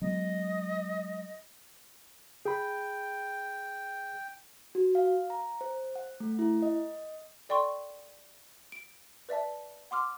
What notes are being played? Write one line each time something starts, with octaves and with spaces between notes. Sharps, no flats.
F#3 G#3 B3 D#5
G#4 G5 B5
F#4
F5
A#5
C5
F#5
A3
E4
D#5
A4 D5 G5 C6 C#6
D7
B4 D5 E5 A5
F#5 C6 D6 F6